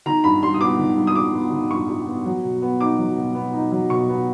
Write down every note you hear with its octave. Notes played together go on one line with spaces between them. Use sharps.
D#3 A#5
G2 B5
G3 C6
D#6
B3 D6
D#3
G2
D#6
G3 D6
B3
D#3
G2 C#6
G3
B3
F#3
B2
B3
D#4 D6
F#3
B2
B3
D#4
F#3
B2 C#6
B3